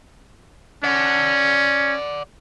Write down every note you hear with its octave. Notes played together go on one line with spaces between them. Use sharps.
C#4 D5 F#5